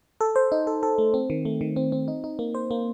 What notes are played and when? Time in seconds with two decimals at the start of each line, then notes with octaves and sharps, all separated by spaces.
0.21 A4
0.36 C5
0.52 D#4
0.67 A4
0.83 A4
0.98 A3
1.14 C4
1.30 D#3
1.45 A3
1.61 D#3
1.76 C4
1.92 C4
2.08 D#4
2.24 D#4
2.39 A#3
2.55 C5
2.71 A#3